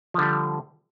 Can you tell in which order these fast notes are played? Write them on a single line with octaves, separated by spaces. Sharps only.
F3 D3 G3